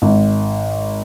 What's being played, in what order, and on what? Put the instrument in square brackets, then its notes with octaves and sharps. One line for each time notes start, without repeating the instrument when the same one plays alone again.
[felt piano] G#1